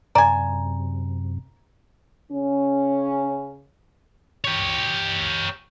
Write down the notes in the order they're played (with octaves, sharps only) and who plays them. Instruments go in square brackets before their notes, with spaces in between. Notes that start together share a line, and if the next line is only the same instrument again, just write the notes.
[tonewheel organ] F#2 C3 [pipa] D5 G#5 [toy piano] A#5
[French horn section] C#3 C#4
[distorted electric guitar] G4 C#5